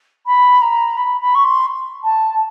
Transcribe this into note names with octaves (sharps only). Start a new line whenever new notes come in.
B5
A#5
B5
B5
C#6
C6
A5